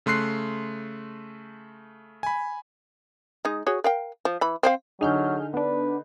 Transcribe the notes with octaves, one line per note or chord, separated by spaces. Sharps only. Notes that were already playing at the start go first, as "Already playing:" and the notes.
C#3 A3 C6 F#6 C7
G#5 B5
G#3 D#4
F#4 G#4 C#5
A#4 F5 G5
F3
E3 B5
C4 C5 F5
D3 F#3 D#4 G#4 F6 G6
B3 D4 B4